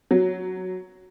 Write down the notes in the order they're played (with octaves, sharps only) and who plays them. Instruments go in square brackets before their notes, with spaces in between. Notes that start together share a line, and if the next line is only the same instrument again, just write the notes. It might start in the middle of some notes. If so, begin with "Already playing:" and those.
[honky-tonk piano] F#3